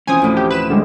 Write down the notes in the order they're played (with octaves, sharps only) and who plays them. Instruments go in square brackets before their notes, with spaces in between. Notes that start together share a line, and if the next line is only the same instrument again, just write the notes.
[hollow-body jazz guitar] E3 F3 C#4 [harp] C4 [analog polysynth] G#5 D#6
[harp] D2 A2
[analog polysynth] G4
B4 E7
D3 G3 G#3